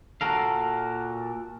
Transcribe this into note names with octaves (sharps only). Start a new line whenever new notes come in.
A#2 F#4 A4 A#4 F5